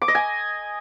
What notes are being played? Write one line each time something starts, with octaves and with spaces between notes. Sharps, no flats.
D6
D#5
G#5